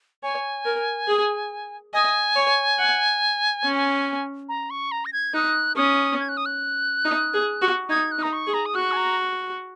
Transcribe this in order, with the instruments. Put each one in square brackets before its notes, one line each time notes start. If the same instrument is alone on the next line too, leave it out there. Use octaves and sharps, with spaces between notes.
[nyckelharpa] C#5 [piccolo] G#5
[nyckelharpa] A#4
G#4
[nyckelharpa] D#5 [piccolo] G#5
[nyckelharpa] C#5
F#5
C#4
[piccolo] A#5
C#6
A#5
A#6
G#6
[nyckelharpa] D#4 [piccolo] F#6
[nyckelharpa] C#4 [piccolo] D#6
[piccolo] G#6
F#6
D#6
F#6
[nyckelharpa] D#4
G#4
F#4
[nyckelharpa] D#4 [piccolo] G#6
[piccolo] F#6
[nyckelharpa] D#4
[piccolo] A#5
C#6
[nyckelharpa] G#4
[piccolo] A#5
D#6
[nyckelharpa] F#4 [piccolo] F#6
[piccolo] G#5
A#5